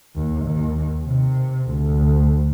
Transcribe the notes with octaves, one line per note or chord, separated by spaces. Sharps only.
D#2
D#2
C3
D2